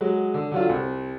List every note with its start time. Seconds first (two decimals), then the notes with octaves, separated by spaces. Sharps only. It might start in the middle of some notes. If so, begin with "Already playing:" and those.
0.01 F#3 G#3
0.34 D3
0.52 D3 F#3 F4
0.69 C2